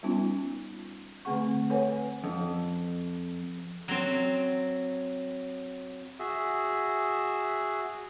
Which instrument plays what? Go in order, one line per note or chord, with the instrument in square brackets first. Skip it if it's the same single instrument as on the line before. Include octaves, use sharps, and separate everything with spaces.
[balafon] G3 B3 C#4 D#4 F4
D3 A3 C4 G#4 F#5 C#6
A4 B4 C#5 F#5 G#5
[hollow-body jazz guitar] F2
[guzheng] F#3 C4
[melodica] F#4 G#4 E5